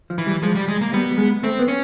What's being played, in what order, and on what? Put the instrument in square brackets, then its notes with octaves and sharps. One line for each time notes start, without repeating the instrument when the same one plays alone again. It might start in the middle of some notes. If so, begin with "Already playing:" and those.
[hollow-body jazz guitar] F3
[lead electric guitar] E3
[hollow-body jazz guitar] G3
[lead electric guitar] F3 [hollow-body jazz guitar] G#3
[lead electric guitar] G3
G#3
A#3
[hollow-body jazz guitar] G3 [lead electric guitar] B3
[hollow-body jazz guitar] G3
G#3
[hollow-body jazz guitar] A3 [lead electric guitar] C4
[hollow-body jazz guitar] B3
[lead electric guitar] C#4